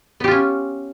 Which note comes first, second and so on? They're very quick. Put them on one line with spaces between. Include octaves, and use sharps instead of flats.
B3 G4 F4 C#4